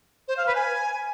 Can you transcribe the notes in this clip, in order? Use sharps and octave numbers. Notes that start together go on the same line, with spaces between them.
C5
F5
B4
G#5